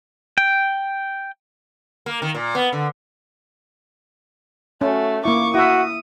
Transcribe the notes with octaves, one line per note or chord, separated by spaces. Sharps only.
G5
A#3
D#3
A#2
B3
D3
A3 C#4 F#4
A#3 E4 C#6 D6
E4 F#4 E5 D#6